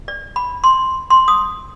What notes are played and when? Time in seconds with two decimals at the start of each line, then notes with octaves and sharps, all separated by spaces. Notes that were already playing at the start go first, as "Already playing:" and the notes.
0.08 D5
0.36 B5
0.64 C6
1.10 C6
1.28 D#6